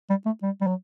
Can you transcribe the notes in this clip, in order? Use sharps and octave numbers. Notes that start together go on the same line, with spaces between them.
G3
A3
G3
G3
F#3